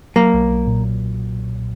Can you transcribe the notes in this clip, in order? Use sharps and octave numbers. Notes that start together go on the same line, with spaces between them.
F#3 A#3
B1
B1
A#2